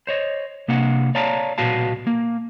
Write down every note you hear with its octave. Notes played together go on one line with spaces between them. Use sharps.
C5 C#5 D#5
C3 A#3 D4 F#5
C#5 D5 F5 A5 A#5
B1 A#2 B3 F#4 F5 A5
A#3